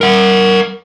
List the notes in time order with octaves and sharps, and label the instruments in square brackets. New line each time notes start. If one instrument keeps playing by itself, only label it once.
[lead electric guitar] A#4 F#5